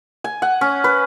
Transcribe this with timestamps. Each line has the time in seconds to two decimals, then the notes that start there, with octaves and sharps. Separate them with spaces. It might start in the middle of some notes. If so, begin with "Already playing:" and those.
0.24 G#5
0.42 F#5
0.61 C#4
0.84 B4